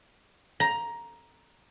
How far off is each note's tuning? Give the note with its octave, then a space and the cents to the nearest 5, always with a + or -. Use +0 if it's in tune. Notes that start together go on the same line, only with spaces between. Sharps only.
A#5 +10